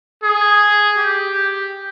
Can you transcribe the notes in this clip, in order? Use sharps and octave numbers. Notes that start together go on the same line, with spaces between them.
G#4
G4